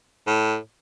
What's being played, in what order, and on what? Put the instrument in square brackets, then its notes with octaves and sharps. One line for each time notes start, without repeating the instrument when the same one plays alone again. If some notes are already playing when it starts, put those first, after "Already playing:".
[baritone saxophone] A2